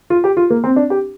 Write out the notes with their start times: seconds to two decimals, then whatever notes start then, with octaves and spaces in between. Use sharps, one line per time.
0.10 F4
0.24 G4
0.37 F4
0.50 A#3
0.64 C4
0.76 D4
0.90 G4